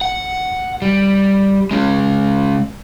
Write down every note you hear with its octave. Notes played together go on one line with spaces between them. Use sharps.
F#5
G3
G#3 C#4